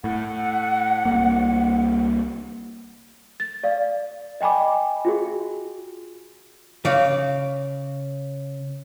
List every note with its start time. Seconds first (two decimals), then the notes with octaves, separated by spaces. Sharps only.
0.04 A2 F#5
1.05 C2 A#3
3.40 A6
3.64 D5 F5
4.41 D#5 G5 G#5 B5 D6
5.05 F4 F#4 G#4
6.85 C#3 D5 F5